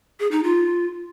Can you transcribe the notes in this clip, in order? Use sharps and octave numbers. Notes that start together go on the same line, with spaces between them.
G#4
D#4
F4